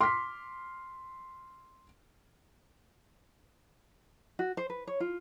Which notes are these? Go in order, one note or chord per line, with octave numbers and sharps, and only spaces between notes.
C6 D6 F6 B6
F#4
C5
B4
C#5
F4